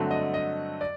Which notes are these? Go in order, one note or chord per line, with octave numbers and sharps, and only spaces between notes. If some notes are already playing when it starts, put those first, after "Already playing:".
Already playing: G2 D3 F#3 A3 C4
D#5
D#5
D5